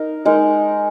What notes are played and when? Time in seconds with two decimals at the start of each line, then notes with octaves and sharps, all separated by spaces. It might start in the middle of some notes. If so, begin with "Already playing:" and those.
Already playing: D#4 A#4
0.25 G#3 D#4 A#4